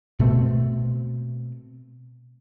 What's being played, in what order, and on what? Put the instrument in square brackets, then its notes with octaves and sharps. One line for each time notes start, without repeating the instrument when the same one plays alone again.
[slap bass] B2 A3 C4